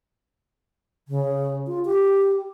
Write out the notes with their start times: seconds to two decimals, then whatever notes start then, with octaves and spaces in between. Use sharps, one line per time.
1.08 C#3
1.67 F4
1.85 G4